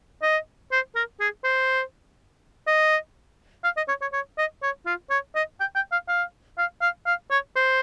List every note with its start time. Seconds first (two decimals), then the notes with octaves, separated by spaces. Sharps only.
0.22 D#5
0.72 C5
0.95 A#4
1.20 G#4
1.44 C5
2.67 D#5
3.64 F5
3.77 D#5
3.88 C#5
4.02 C#5
4.13 C#5
4.38 D#5
4.63 C#5
4.86 F4
5.10 C#5
5.35 D#5
5.60 G5
5.76 G5
5.92 F5
6.08 F5
6.58 F5
6.81 F5
7.06 F5
7.31 C#5
7.56 C5